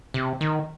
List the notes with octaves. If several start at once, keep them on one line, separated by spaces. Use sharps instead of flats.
C3
D#3